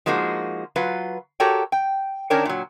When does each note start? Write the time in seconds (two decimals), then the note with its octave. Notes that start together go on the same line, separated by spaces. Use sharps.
0.06 F3 G#3 A#3 D#4 F#4
0.76 F#3 F4 B4
1.40 F#4 G4 A4 A#4 C#5 G5
1.72 G5
2.30 D#3 C#4 D4 A#4 C#5 G5
2.45 A#2 F#3